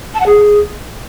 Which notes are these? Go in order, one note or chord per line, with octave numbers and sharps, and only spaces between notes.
A5
F#5
G#4